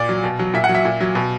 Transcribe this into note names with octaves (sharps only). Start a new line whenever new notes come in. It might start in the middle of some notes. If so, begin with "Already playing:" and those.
Already playing: A#2 D5
F#3
B2
F#3
A#2 E5
F#5
F#3
E5
A#2
F#3
B2